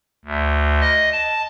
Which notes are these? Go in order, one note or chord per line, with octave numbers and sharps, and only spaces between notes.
D2
D#5
A5